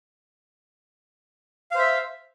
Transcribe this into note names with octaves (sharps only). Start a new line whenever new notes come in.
C5 E5 F5